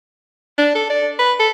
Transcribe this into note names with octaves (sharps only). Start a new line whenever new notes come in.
D4
A4
D5
B4
A4